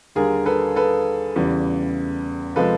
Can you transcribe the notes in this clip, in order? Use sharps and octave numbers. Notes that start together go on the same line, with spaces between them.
D#2 D3 G3 G#4 A#4
A4 B4
A4 B4
E2 C#3 E3 G3
C3 F3 G#3 A4 B4